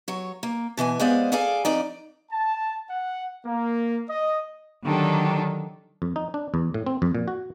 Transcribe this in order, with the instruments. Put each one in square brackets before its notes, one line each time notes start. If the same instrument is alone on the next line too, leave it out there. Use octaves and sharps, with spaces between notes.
[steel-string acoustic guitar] F#3 C#5
A#3
B2 E3 C5 G#5
G#3 B3 G#4 C5 D5 F5
G#4 A4 D5 F5 G#5
F2 D#4 D5
[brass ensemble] A5
F#5
A#3
D#5
[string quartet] D3 D#3 F#3 D4 G4 A4
[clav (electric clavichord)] F2
D#4
D4
E2
A2
C4
F2
A#2
F#4